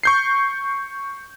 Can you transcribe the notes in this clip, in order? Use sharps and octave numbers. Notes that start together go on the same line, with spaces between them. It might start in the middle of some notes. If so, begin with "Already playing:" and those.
C#6 G6 C7